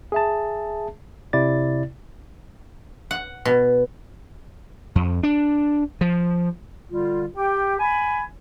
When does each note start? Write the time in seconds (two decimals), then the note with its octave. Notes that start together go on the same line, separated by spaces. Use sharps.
0.12 G#4 E5 A5
1.33 C3 E4 D5 A6
3.11 F#5
3.45 B2
4.95 F2
5.23 D4
6.01 F3
6.90 D3 G3 F4
7.36 G4 G5
7.80 G#5 B5